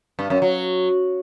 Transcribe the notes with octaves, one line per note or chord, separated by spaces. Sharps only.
G2
F#2
F#3